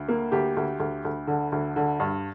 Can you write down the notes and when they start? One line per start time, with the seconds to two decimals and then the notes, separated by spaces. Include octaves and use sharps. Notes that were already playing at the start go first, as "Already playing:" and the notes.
Already playing: D2
0.08 A#3
0.32 D2 G4
0.57 D2
0.80 D2
1.05 D2
1.27 D3
1.52 D2
1.76 D3
2.00 G2